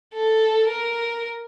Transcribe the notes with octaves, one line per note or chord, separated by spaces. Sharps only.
A4
A#4